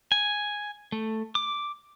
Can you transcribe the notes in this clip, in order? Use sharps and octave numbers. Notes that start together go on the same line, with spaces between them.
G#5
A3
D6